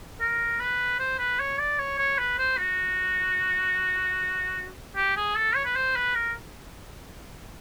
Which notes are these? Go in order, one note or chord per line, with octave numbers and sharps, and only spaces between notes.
A#4
B4
C5
B4
C#5
D5
C#5
C#5
B4
C5
F#4
G4
G#4
A4
C#5
B4
C5
B4
A#4